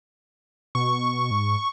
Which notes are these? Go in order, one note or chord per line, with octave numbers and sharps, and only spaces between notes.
B2 C#6
G#2